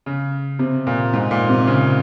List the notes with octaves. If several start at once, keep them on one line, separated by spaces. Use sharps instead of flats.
C#3
C3
A#2
G#2
A#2
C3
C#3